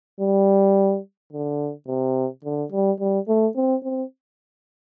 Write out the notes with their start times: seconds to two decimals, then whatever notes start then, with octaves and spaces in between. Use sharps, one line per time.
0.20 G3
1.32 D3
1.88 C3
2.44 D3
2.72 G3
3.00 G3
3.28 A3
3.56 C4
3.84 C4